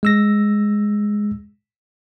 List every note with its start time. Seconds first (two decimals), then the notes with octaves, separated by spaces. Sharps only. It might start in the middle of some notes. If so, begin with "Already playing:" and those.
0.03 G#3 E6 A#6